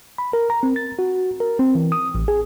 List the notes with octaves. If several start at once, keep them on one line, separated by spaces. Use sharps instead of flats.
B5
A#4
A#5
C4
A6
F#4
A#4
C4
E3
D#6
A1
G#4